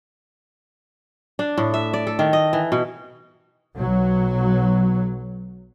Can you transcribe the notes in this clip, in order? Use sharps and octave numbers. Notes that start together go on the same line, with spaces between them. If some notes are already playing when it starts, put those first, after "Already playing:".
D4
A2
E5
D5
A4
D#3
D#5
E3
B2
B1 F#3